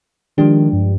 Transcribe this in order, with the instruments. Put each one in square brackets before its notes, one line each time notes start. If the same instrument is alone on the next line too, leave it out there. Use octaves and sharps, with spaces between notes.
[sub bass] D#3 [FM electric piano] F3 G#3 D4 G4
[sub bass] G2